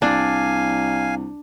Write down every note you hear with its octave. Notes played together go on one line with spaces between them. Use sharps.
C2 D4 F5 G#5